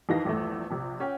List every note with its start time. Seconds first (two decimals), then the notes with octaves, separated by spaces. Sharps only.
0.09 F2 D#3 E3 D#4 F5 A#6
0.25 A#1 E2 G2 A3
0.70 A#1 C3
1.00 C#4 F#5 G5